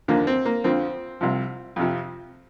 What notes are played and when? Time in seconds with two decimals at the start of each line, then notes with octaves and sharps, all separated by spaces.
0.08 D#2 D3 F3 A#3
0.27 C4
0.45 A#3
0.64 F2 D3 F3 C4
1.21 C2 C3 F3
1.76 F2 C3 F3